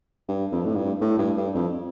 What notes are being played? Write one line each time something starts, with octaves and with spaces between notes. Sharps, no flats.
G2
F2
A2
G2
A2
G2
G2
F2